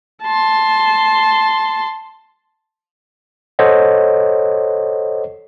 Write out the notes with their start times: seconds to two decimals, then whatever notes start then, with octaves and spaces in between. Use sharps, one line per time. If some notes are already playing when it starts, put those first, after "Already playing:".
0.22 A5 C6
3.59 A4 C5 C#5 D#5 F#5